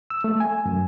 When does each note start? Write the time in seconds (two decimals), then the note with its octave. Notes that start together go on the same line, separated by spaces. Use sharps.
0.10 E6
0.24 A3
0.40 G#5
0.66 F#2